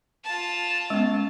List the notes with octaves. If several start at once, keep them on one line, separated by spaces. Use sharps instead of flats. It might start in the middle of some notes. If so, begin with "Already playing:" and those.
F4 A5
G#3 B3 C#4